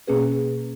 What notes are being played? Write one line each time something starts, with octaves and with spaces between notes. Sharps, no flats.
B2 A#3 C#4 G#4 B4